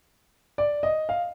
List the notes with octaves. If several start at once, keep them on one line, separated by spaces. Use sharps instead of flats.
D5
D#5
F5